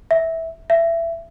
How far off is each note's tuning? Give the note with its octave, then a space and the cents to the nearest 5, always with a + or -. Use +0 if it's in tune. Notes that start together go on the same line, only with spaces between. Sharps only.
E5 -15
E5 +20